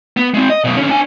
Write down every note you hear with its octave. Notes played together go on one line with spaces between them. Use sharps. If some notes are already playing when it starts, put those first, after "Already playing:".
B3
G#3 C4
D#5
F#2 B2
D3 C#4
D4 G#5